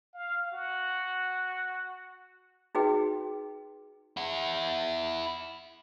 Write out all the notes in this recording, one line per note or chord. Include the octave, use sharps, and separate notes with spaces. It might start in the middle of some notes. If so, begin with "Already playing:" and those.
F5
F#4
D#4 F#4 G#4 B4 G5
E4 F#5